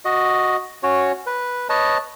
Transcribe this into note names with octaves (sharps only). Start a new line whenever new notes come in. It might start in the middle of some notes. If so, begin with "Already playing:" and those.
F#4 D#5
C#4 F#4 C#5
B4
B4 C#5 D#5 A5